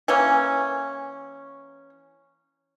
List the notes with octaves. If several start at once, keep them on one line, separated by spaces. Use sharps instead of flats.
E3 A#3 C#4